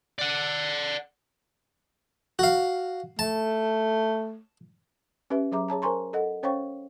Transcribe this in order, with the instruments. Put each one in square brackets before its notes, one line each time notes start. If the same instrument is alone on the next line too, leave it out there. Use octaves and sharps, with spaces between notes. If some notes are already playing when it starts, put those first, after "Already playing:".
[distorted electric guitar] D5 F#5
[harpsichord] F#4 F5
[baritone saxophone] A3 [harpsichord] A5
[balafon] C#4 G4 B4 E5
F#3 G#4 E5 A#5 D6
G#4 C#5 A5 A#5
A#4 C5 G#5 A#5 C6 C#6
A4 D#5 F#5
C#4 C5 C#5 F5 G5 C#6